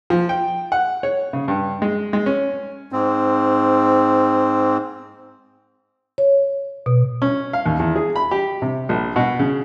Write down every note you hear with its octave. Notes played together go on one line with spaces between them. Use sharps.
F3
G5
F#5
C#5
C#3
G2
G#3
G#3
C#4
G#2 C4
C#5
B2
C#4
F5
D#2
E2
G#4
B5
G4
C3
A#1
B2
C#3